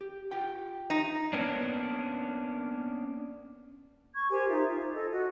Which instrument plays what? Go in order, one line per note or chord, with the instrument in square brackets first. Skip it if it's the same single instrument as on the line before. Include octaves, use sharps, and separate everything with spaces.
[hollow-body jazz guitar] G4
F4 G4 G5
[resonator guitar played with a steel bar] D#4
[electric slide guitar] A#3 B3 C#4 D4
[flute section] C#6 G#6
G4 A#4 C5 G#5
D#4 F4 C5 E5
F4
A4 D#5
F#4 D#5